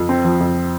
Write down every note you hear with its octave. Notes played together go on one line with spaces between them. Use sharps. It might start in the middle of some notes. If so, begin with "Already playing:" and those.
Already playing: F2
C4
F3
F2